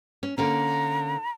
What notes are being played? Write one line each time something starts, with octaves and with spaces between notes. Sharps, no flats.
C#4
D3 A#3 C#4 A#5